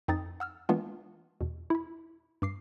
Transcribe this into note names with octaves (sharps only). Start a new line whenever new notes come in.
F2 C4 D#4 D#6 A6
F#5 E6 F6
E3 G#3 A#3 B3 D4 F4
E2 B2
E4 B5
G2 D6 C7